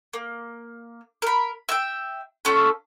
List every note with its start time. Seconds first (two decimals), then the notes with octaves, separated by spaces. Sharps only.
0.13 A#3
1.22 A#4 B5
1.69 E5 G5
2.45 A3 C#4 F4 A4